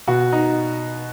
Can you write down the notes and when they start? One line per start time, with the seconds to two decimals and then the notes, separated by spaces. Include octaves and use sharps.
0.08 B2 F#4
0.32 D#4